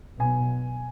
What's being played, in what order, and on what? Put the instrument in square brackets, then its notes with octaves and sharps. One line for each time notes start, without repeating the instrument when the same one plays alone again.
[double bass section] B1 B2 B3 [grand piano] G#5